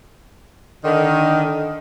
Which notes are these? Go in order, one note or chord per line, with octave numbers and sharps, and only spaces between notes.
D3 D#3